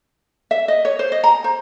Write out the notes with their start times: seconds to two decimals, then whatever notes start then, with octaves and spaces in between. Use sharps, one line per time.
0.51 E5
0.68 D#5
0.85 C#5
0.99 C5
1.12 D#5
1.24 A#5
1.44 C5